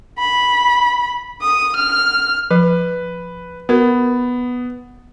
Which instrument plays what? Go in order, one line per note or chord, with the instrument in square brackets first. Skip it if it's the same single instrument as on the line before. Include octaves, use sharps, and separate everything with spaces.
[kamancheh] B5
D#6
F6
[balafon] F3 [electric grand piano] B4
[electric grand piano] B3 [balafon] F#4 A#4